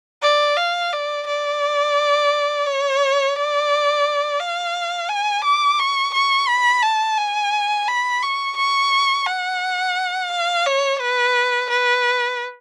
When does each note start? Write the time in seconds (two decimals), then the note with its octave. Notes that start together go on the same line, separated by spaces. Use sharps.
0.22 D5
0.57 F5
0.93 D5
1.27 D5
2.66 C#5
3.36 D5
4.40 F5
5.09 G#5
5.44 D6
5.79 C#6
6.14 C#6
6.48 B5
6.83 A5
7.18 G#5
7.88 B5
8.22 C#6
8.57 C#6
9.27 F#5
10.30 F5
10.66 C#5
11.01 B4
11.70 B4